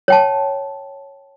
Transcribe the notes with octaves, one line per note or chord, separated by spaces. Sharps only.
C#5 G5 A5